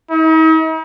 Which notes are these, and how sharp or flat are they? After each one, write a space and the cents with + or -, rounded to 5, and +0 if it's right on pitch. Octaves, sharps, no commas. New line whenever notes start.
D#4 +45